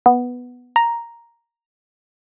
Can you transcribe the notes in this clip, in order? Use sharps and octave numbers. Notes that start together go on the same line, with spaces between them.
B3
A#5